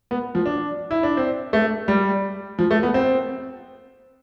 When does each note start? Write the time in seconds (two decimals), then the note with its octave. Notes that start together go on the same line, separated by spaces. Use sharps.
0.11 B3
0.35 F3
0.46 D4
0.91 E4
1.03 D4
1.17 C4
1.53 A3
1.88 G3
2.59 F3
2.71 A3
2.83 B3
2.94 C4